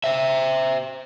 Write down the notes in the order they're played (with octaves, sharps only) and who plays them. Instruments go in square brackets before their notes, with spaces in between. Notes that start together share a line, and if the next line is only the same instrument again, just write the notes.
[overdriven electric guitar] C5 E5